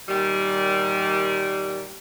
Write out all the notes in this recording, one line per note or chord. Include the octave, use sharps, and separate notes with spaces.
A#2 D#3 G3